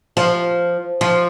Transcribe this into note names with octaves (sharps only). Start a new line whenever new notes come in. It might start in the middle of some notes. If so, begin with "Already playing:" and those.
F3
F3